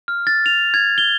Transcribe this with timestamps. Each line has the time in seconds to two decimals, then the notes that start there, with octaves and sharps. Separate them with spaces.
0.08 F6
0.27 A6
0.46 F7
0.74 G#6
0.98 G7